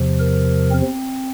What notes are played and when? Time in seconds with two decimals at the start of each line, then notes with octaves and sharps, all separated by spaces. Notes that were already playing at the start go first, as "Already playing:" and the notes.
Already playing: E2 C3 F3
0.19 A#4
0.71 C4